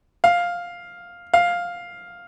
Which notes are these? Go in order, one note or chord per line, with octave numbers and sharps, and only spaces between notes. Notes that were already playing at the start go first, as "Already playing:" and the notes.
F5
F5